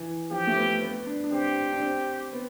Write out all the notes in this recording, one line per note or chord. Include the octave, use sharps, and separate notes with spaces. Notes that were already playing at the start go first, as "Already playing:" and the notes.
Already playing: E3
F3 G4
A3
B3
B3
D4
D4
C4 G4
D4
C4
B3